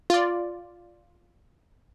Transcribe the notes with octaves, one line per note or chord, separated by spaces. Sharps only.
F4 D5